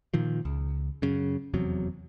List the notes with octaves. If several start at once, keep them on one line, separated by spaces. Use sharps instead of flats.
A#2 D#3 F3
C#2
F#2 C#3
F1 E2 C3 F#3